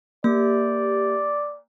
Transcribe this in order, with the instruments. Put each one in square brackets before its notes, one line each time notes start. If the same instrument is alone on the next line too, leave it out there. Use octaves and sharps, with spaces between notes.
[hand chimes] A#3 [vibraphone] G4 [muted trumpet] D5